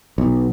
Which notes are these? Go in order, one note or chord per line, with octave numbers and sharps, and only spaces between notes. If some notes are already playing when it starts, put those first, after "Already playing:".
B1